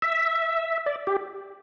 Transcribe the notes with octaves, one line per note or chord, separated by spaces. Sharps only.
E5
D5
G4